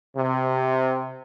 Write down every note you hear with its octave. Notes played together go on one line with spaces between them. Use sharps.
C3